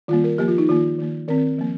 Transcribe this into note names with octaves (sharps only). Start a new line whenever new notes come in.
D#3 G3 A#3 F4
A#4
F3 A#3 G4
F4
D#4
D#3 A#3 F4
D#3 A#3
D#3 C4 A#4
F3 A#3